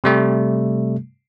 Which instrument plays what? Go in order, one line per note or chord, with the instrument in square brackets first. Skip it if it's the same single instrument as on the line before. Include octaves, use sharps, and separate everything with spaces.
[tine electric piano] C3 G3 A3